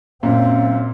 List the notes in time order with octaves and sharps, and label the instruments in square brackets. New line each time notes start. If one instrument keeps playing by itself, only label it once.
[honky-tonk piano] F#2 [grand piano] A#2 [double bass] C4 [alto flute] F5